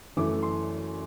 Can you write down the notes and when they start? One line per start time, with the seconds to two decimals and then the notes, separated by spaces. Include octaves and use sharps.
0.16 F#2 E3 A3 D6
0.43 C6